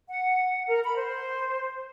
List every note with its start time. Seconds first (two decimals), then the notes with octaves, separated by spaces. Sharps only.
0.08 F#5
0.66 A#4
0.83 B5
0.96 C5